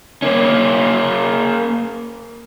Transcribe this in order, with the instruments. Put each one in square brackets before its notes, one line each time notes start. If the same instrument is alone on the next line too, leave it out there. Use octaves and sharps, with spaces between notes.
[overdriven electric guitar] A#3 C#4